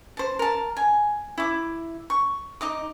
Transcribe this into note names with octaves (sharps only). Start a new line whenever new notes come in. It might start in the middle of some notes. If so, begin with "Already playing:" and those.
C5 A5
A#4 A5
G#5
E4 D6
C#6
D#4 D#5 D6